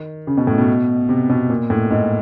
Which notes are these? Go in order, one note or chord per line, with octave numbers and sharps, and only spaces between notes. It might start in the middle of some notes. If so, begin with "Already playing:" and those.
Already playing: D#3
C#3
B2
A2
B2
C3
B2
A#2
A2
G#2